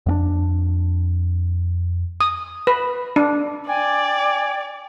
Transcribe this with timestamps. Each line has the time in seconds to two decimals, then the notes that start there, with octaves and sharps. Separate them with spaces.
0.06 F2 A#3 D4
2.21 D#6
2.67 B4
3.16 D4
3.68 D5 G5 G#5